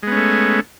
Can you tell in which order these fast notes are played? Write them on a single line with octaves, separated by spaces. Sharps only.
G#3 B3 C#4 A3